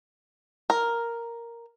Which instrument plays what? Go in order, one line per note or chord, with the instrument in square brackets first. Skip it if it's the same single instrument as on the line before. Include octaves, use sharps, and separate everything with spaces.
[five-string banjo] A#4